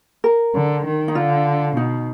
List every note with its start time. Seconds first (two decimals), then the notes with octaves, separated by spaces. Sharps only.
0.24 A#4
0.55 D3
0.85 D#3
1.08 D#4
1.15 D3 F4
1.77 B2 D#4